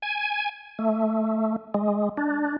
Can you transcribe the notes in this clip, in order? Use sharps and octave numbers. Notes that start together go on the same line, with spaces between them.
G#5
A3
G#3
D4